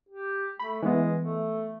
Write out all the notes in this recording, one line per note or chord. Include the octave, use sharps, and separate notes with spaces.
G4
A3 B5
E3 G#3 B3
A3